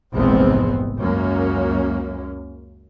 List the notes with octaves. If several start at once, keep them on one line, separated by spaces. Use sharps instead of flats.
F1 A#1 E2 G#2 B3 C4
C#2 F#2 A#3 C#4